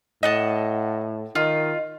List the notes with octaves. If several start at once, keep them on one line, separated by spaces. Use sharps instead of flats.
A2 D#5 F#5 A5
D#3 F4 D#5